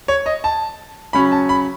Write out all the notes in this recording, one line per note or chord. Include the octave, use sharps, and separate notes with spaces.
C#5
D#5
A5
C#3 F#3 C#4 B5
A5
B5